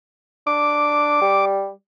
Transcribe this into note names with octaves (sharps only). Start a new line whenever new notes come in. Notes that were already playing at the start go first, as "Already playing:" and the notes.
D4 D6
G3